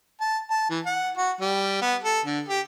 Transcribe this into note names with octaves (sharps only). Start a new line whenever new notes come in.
A5
A5
E3
F#5
F#4
G3
B3
A4
D3
G4